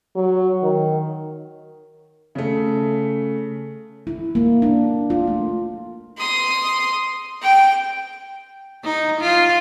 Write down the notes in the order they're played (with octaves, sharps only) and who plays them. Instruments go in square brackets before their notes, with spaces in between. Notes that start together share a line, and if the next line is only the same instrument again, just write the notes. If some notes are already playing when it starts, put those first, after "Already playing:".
[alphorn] F#3
D#3
[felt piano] C#3 A3
[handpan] E4
A#3
D4
F4
A3
[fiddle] C6 D#6
G5
[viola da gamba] D#4
F4